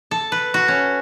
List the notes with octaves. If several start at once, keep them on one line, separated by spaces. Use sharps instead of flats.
A4
B4
F#4
C#4